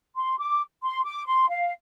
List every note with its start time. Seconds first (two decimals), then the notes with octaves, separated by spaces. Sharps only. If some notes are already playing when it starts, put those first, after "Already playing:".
0.16 C6
0.38 D6
0.83 C6
1.05 D6
1.26 C6
1.49 F5